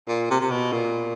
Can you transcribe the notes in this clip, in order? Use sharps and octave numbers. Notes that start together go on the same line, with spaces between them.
A#2
C3
C3
B2
A#2